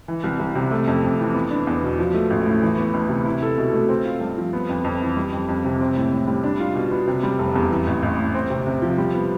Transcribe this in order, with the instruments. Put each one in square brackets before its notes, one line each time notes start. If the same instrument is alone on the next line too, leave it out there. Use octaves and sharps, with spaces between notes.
[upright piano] E3
C2
C2
C3
A3
F2
F2
E3
B3
D4
E2
B2
F3
A3
A1
A2
E3
B3
D2
C3
E4
A4
B2
A3
C4
F4
G2
F3
B3
F2
F2
E3
G3
F2
F2
C3
C4
A2
A2
G3
D4
F4
B2
B3
C3
G3
F1
E2
E3
A1
A1
A2
C4
C3
C3
F3
G3
B3